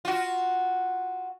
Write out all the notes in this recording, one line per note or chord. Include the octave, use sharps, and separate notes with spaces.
F4 F#4